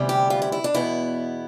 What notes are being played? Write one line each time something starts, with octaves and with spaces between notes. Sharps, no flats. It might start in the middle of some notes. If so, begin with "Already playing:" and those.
Already playing: D2 C3 E3 G3 B3
G4
F4
E4
E4
D4
E2 B2 B3 E4